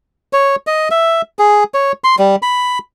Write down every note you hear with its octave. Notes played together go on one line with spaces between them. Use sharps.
C#5
D#5
E5
G#4
C#5
C6
G3
B5